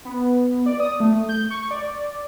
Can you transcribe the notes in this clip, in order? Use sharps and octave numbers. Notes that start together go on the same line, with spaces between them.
B3
D5
D#6
A3
G6
C#6
D5